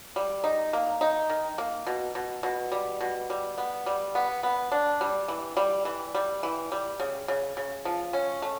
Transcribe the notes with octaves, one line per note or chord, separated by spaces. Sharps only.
G3
D#4
A#3
D#4
D#3
A#3
B2
B2
B2
G3
B2
G3
B3
G3
B3
B3
D4
G3
E3
G3
E3
G3
E3
G3
C#3
C#3
C#3
F3
C#4
A3